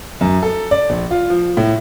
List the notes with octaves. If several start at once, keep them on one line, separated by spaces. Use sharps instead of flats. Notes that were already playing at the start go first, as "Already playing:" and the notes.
F#2
A4
D5
A#1
F4
F3
A2